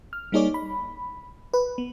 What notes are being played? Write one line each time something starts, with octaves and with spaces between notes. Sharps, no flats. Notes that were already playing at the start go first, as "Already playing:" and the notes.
F6
G3 A#3 D#4 G#4 C#5 D5
B5
B4
B3